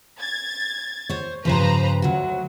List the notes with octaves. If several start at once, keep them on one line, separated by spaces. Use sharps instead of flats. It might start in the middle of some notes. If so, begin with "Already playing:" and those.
G#6 A6
C5 C#5
G2 C#3 F3 B4 C5 A#5
D2 F#3 F#4